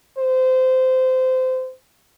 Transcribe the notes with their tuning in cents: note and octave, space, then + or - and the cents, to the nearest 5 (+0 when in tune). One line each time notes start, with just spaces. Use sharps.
C5 -20